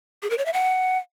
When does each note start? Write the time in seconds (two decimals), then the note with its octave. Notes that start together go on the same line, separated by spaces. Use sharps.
0.23 G#4
0.30 A#4
0.38 C#5
0.46 E5
0.53 F#5